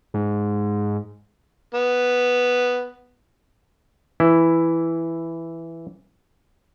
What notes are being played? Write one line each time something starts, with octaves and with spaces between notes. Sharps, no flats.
G#2
B3
E3 E4